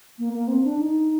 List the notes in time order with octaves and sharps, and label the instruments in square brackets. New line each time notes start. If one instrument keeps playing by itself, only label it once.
[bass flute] A#3
A#3
C4
D4
D#4